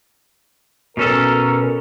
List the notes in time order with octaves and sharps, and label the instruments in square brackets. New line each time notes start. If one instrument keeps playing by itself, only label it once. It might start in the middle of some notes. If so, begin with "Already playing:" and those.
[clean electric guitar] B2 C#4 A4 [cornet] A#4